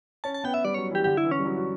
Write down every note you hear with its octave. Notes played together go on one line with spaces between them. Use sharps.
C#4 A5
A5
B3 G5
E5
G3 D5
F#3 C#5
E3 G4
D3 G4
E4
E3
C#4
G3
F#3
F#4